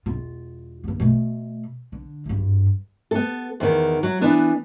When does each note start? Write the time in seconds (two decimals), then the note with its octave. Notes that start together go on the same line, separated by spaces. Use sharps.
0.06 E1 F4
0.84 A#3 B3
1.00 B2 A3
1.92 D3
2.25 G#1 G2
3.11 B3 A4
3.60 E2 D#3
4.03 F#3
4.21 E3 B3 D4